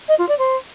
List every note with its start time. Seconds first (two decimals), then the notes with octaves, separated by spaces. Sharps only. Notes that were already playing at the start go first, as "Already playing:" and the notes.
0.08 D#5
0.18 F4
0.28 D5
0.38 C5